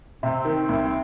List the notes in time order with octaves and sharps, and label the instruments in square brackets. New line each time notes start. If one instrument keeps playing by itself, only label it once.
[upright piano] C3 [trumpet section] C4
[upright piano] D#3
C2